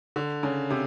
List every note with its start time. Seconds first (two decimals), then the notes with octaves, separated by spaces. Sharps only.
0.16 D3
0.43 C#3
0.70 C3